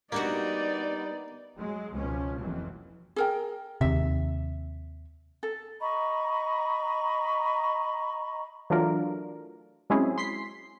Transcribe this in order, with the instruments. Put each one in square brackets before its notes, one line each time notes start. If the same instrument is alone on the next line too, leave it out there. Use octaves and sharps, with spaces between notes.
[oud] G3 D4 F#4 [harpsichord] A#3 [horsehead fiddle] B3 D5 [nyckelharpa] D#4
[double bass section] F#3 G#3
C#2 B2 F3 C#4
F#1 F2 E3 F#3
[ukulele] G#4 A#4 G5
[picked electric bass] D#2 C3 [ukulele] E5
[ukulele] A4
[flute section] D#5 A#5 B5 C#6
[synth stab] E3 F#3 A3 D4 F4 A#4
F#3 G#3 C4 C#4 E4 G#4
C6 B6 C7